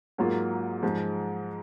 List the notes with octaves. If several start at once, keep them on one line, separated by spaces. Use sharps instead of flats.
G#2 F#3 A#3 F4
G#2 F3 G#3